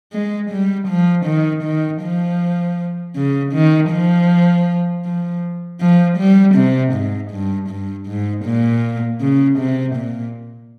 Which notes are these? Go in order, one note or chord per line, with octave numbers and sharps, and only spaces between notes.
G#3
G3
F3
D#3
D#3
F3
C#3
D#3
F3
F3
F3
G3
C3
G#2
G2
G2
G#2
A#2
C#3
C3
A#2